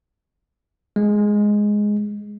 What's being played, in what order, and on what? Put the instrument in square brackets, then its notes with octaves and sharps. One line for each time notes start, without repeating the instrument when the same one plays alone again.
[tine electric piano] G#3